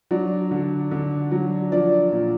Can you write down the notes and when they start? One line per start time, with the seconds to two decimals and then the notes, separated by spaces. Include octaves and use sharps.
0.11 F#3 D4 D5
0.51 D3
0.91 D3
1.31 F#3
1.72 F3 D4 D5
2.12 A#2